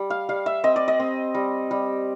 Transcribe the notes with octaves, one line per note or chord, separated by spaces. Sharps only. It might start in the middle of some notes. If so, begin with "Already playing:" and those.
Already playing: G3
F5
G3 F5
E5
C4 D#5
D5
D#5
C4
G3
G3